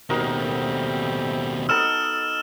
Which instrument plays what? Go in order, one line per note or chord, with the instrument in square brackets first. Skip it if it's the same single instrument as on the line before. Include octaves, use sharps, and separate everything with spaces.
[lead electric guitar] D#2 B2 [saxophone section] G3 A3 C4 [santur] D#4 F#4 A#4
[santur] B3 D#4 A4 [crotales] E6 F6 E7